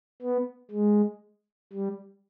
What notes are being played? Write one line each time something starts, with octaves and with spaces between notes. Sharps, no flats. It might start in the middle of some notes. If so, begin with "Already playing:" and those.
B3
G#3
G3